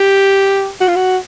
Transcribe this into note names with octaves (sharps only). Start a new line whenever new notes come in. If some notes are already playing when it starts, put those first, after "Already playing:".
Already playing: G4
F#4
F4
F#4